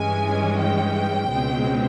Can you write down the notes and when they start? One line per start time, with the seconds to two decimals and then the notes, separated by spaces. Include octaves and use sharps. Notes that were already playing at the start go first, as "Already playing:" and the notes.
Already playing: G2 E3 G#3 C#4 G#5
0.61 G5
1.31 C#2 B2 G#3 C4